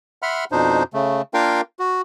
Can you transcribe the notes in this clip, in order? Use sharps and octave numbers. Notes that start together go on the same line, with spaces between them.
E5 F#5 B5 C6 F6
F2 B2 D4 D#4 C5
C#3 A3
A#3 D4 F4 A#4 F5 G5
F#4